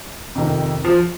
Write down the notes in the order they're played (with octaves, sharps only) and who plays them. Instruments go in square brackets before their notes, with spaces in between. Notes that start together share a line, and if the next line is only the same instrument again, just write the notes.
[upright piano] F2 C3 D#3
[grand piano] F3